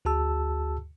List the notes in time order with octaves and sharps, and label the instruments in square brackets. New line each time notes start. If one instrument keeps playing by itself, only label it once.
[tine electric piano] D2 F#4 G#4 A5 E6